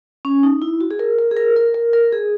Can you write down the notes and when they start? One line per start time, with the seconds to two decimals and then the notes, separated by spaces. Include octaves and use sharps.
0.25 C#4
0.43 D#4
0.62 E4
0.81 F#4
0.91 G#4
0.99 A#4
1.18 A#4
1.31 G#4
1.37 A#4
1.56 A#4
1.74 A#4
1.93 A#4
2.12 G#4